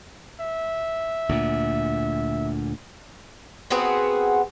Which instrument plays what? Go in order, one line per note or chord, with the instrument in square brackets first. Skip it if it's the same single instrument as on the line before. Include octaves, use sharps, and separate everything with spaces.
[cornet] E5
[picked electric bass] D2 A#2
[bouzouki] B3 C4 F#4 G#4